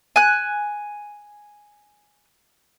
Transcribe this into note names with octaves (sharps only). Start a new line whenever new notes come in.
G#5 F#6